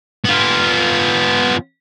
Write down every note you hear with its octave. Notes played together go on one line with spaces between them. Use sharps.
B3 F4